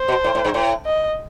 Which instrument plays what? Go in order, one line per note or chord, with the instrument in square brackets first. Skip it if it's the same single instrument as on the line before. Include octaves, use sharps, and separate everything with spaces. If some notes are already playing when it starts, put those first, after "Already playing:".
Already playing: [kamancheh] C5
[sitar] B2
A2
A2
G2
A2
[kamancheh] D#5